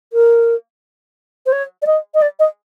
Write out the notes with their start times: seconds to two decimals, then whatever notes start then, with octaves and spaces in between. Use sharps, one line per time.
0.13 A#4
1.46 C5
1.52 C#5
1.82 D5
1.86 D#5
2.14 D#5
2.22 D5
2.39 D#5